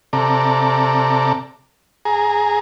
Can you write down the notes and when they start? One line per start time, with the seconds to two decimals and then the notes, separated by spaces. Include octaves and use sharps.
0.13 C3 A4 D5 A#5
2.05 G#4 A#5